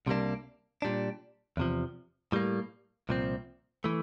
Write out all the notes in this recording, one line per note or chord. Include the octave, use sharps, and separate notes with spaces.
C2 C3 G3 A#3 D4
A#2 G3 D4
E2 C3 F3
A2 G3 A#3
C2 A#2 F3 C4
E3 A3